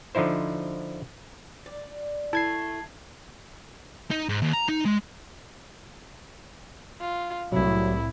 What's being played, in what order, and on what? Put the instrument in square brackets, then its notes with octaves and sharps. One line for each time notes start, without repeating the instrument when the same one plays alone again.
[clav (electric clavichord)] D3 F3 D#4 E4 C5
[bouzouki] D5
[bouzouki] A3 [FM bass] E4 [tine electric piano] A5 G#6 C7
[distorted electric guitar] D#4
G#2
D#2
A#5
D#4
G#3
[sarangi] F4
[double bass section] C2 A2 [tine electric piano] F#3 [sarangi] E4